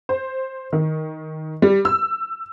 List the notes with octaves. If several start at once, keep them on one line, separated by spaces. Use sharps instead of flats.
C5
D#3
G3
E6